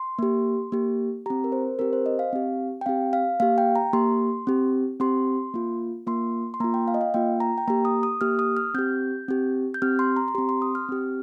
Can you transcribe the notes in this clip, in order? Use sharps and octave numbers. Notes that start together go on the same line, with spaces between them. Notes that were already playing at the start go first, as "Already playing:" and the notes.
Already playing: C6
A#3 G4
A#3 G4
C4 G4 A#5
A#4
C5
C4 G4 A#4
C5
D#5
F5
C4 G4
G5
C4 G4 F5
F5
A#3 G4 F5
G5
A#5
A#3 G4 C6
C4 G4
C4 G4 C6
A#3 F4
A#3 F4 C6
C6
A#3 F4 A#5
G5
F5
D#5
F5
A#3 F4 G5
A#5
G5
A#3 G4 A#5
D#6
D#6
A#3 G4 F6
D#6
F6
C4 G4 G6
C4 G4
G6
C4 G4 F6
C6
A#5
A#5
C4 G4 C6
C6
D#6
F6
C4 G4